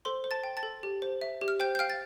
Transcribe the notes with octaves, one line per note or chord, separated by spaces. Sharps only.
A4 C5 C6
C5
A5 A6
G5
A5 A6
A4
G4
C5
E5
G4
F6
C5 G5 G6
G6
F5 G5 F6
A6